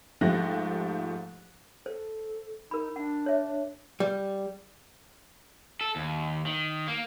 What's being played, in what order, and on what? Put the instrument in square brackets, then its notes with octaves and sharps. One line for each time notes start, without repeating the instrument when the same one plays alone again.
[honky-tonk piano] G#2 F3 A3 G4 F#6 A#6
[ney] A4 [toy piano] C5
[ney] D#4 [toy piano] A#4 B5
[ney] D4 [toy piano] F#5
[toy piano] C#5 E5
[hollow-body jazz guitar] G3
[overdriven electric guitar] A4
D#2
D#3
A#3